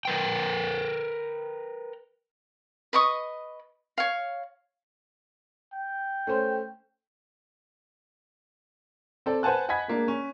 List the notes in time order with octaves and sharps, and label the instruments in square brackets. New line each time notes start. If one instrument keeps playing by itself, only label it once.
[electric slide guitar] A#4 B4 G5
[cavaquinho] B4 D#5 C#6 D#6
C#5 F5
[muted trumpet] G5
[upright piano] A3 C#4 C5
C4 A4 D5
B4 C5 F#5 G#5 A5 F#6
D#5 F#5 G#5 B5 G#6 B6
G#3 A#3 D4
C#4